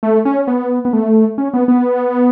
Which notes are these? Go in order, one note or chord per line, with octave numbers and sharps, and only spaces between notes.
A3
C#4
B3
B3
A3
C#4
B3
B3